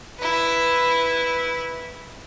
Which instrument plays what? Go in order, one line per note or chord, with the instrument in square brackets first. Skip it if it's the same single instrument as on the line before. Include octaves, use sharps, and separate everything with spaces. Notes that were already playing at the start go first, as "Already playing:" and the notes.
[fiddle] E4 B4